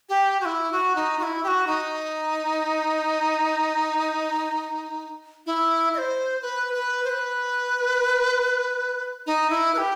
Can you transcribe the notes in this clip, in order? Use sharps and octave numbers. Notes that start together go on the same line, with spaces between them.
G4
F#4
E4
F#4
D#4
F#4
E4
G4
F#4
D#4
E4
D#5
C5
B4
B4
C5
B4
D#4
E4
B4
G4